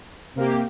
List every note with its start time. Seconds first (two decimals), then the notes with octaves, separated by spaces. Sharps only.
0.35 C3 A#3 G4